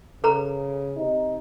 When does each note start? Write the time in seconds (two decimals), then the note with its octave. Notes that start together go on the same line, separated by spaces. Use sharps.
0.24 C#3 A4 B4 A#5
0.97 C3 D#4